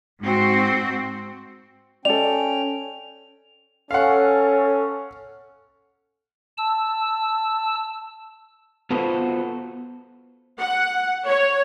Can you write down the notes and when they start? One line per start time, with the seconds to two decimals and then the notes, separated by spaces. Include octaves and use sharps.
0.21 G#2 C4 F#4
2.05 C#4 A4 D5 G5 F7
3.91 C#4 A4 F5 F#5
6.58 A5 E6
8.91 B3 F4 F#4 A4 B4 C5
10.59 F#5
11.27 C#5